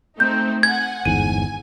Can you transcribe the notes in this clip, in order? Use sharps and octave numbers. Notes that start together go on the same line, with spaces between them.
A3 C4 D#4 G6
F#5 G#5 G#6
G1 E2 G#2 G#5 D#7